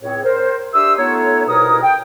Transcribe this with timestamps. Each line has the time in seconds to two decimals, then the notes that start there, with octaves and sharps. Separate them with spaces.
0.02 C#2 A2 C4 G#4 C#5
0.23 A#4 C5
0.73 D4 G4 E5 C6 D#6 E6
0.97 A3 B3 D#4 F4 A4 C#5
1.47 C2 B2 D#4 A#4 B4 D#6
1.82 G5